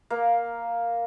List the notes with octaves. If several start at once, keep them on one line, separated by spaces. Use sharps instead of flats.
A#3